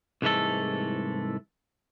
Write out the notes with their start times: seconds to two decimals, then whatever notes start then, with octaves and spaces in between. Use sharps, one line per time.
0.22 C2 G#2 E3 G#3 A3 A4